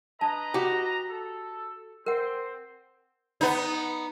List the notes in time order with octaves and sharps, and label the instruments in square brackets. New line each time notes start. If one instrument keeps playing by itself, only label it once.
[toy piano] D4 A5 [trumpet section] B4 D#5 A#5
[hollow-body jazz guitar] F#4 G4
[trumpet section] A4
[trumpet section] C4 C5 [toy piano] A#4 F#5
[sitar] B3 D#4